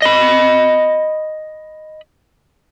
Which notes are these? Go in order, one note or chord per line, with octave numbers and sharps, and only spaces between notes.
D#5 B5